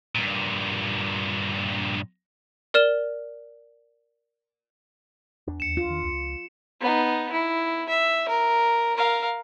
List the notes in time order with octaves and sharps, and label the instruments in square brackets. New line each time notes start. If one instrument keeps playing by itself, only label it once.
[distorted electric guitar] G2 A#2
[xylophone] A#4 D5 F6 E7 G7
[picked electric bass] E2 D4
[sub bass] D#2 [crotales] C#7 E7
[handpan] F4
[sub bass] D#3
C#2
[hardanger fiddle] B3 D#4
E4
E5
A#4
A#4 F5